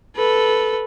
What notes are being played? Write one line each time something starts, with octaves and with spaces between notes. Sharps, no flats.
A4 B4